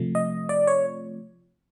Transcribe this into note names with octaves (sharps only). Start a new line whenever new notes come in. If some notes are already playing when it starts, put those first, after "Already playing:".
Already playing: C3 F3 A3
D#5
D5
C#5